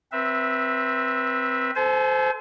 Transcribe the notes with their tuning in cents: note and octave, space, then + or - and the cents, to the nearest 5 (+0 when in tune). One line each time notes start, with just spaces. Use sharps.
C4 +0 B4 -25 E5 +0
A4 -5 C5 -15 G#5 +40